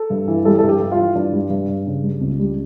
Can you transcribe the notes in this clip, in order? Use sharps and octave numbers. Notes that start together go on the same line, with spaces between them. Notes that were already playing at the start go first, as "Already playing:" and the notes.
Already playing: A4
G2
E3
G3 A4
G2 A4
G4
G2
F4
E3
G2 D4
G3
G2
G2
C#3
G3
C#2
G3